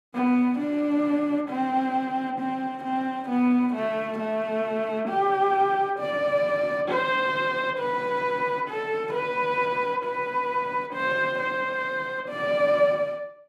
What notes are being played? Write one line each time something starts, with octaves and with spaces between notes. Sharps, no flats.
B3
D4
C4
C4
C4
B3
A3
A3
G4
D5
C5
B4
A4
B4
B4
C5
C5
D5